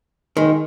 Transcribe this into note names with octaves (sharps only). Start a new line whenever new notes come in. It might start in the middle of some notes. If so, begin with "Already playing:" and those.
D#3 G#3